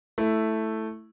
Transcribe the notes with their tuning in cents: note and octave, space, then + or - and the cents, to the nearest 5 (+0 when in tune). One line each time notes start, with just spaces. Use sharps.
A3 +0 E4 +0